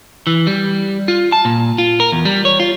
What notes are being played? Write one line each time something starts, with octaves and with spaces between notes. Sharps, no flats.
E3
G3
F4
A5
A#2
F4
A#4
E2
G3
C#5
F4